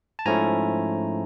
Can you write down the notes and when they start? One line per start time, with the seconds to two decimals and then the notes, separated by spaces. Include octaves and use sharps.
0.19 A5
0.26 G#2 F3 A3 C#4 E4 G#5 A#5